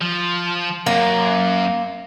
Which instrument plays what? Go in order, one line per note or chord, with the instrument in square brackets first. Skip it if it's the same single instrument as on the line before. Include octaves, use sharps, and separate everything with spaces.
[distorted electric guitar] F3
[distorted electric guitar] F#2 [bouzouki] A#3